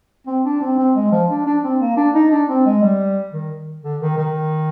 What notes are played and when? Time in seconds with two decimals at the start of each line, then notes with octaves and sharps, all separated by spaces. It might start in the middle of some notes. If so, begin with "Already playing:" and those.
0.27 C4
0.45 D4
0.61 C4
0.78 C4
0.95 G#3
1.12 F3
1.30 D4
1.46 D4
1.63 C4
1.80 A#3
1.97 D4
2.15 D#4
2.31 D4
2.49 C4
2.66 G#3
2.82 G3
3.33 D#3
3.84 D3
4.01 D#3
4.18 D#3